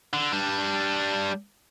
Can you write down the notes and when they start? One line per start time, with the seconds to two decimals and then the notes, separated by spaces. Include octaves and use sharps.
0.13 D3
0.32 G3 D4